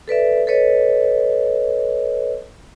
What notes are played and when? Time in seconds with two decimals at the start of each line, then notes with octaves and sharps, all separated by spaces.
0.08 A4 B4 D5 E5
0.47 A4 B4 C#5 D#5